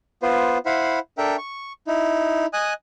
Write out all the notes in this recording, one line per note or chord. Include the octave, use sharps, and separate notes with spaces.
B3 F4 B4 C5
E4 C5 F5 F#5 B5
D4 A4 A#4 E5 G5
C#6
D#4 E4
D#5 G#5 D#6 F#6